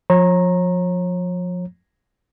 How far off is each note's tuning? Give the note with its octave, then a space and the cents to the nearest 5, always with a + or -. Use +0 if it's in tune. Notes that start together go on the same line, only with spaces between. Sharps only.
F3 +30 C#5 -35 A#5 +0